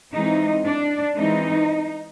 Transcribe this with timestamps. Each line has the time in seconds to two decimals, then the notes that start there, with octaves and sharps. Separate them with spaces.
0.12 E3 G#3 C4 D#4
0.65 D4
1.16 E3 G#3 C4 D#4